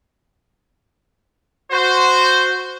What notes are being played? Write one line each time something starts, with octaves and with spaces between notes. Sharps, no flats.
F#4 C5